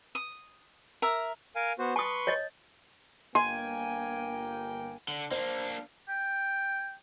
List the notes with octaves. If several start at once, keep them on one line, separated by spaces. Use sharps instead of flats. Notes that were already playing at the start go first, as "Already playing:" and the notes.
D#6
A#4 E5 A#5
A#4 F5 G#5
B3 F#4 C5
B4 A5 C6 C#6 D#6
C#5 D#5
G1 A#3 G5 G#5 C6
D3
A#3 D4 C5
G5